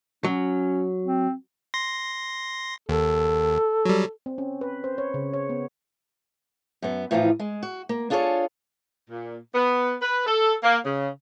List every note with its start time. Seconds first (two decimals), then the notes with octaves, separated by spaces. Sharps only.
0.24 F#3 C#4
1.04 C4
1.74 C6 A#6
2.89 D#2 A4
3.85 F#3 G3
4.26 C4
4.38 C#4
4.61 B4
4.84 C5
4.98 C#5
5.14 C#3
5.34 C#5
5.49 B3
6.82 F#2 B3
7.11 A2 E3 F3 D#4 F4
7.39 G#3
7.63 F#4
7.89 A#3
8.10 D4 F4 G#4 A4 B4 C#5
9.09 A#2
9.54 B3
10.02 B4
10.26 A4
10.63 A#3
10.85 C#3